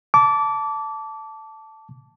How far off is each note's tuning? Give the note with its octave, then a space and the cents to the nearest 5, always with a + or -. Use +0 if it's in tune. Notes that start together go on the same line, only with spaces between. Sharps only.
A5 +0 D6 -25